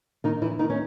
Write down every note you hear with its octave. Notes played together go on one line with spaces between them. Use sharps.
D#3 D#4
E3 E4
D#3 D#4
C#4